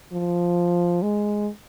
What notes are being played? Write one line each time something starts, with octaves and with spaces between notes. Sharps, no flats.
F3
G#3